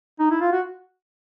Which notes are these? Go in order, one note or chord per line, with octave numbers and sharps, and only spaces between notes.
D#4
E4
F4
F#4